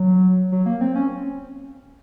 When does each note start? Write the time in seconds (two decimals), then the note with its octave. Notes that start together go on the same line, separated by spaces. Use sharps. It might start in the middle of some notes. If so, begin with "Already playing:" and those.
Already playing: F#3
0.52 F#3
0.66 A#3
0.81 C4
0.95 C#4